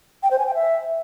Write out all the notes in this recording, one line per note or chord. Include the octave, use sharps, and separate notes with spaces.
G5
C5
G#5
G5
E5